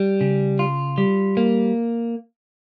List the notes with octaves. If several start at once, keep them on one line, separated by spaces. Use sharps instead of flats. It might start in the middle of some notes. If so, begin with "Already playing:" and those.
Already playing: G3
C#3
F4
G3
A#3